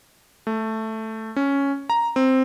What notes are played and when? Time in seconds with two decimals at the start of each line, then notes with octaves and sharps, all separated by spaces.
0.47 A3
1.36 C#4
1.90 A#5
2.16 C4